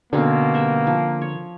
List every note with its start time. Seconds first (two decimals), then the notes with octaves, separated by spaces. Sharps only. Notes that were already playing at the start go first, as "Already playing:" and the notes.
0.13 B2 D3 A#3 C4 C#4
0.54 G3 F#4 E5
0.87 F3
1.22 C#5